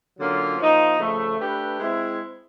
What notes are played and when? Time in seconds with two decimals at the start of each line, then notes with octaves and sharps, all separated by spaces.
0.19 D3 F#3 A#3 C#4 F4
0.58 F3 A#3 D#4
0.99 C#3 F3 A3
1.39 A3 D4 G4 B4
1.79 G#3 C4 E4